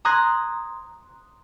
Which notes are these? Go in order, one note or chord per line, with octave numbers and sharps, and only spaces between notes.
A#5 C6 D#6 F#6 G#6 A#6